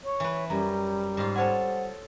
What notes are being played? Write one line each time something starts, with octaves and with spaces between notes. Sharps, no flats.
C#5
E3 B4
F#2 G3 A#5
G#2 F4
A4 C5 C#5 F#5 G#5